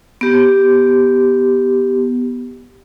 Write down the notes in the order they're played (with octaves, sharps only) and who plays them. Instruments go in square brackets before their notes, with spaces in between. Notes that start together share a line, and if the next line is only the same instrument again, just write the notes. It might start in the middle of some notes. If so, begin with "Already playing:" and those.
[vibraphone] B3 G4